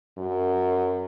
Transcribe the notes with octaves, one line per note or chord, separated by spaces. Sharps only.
F#2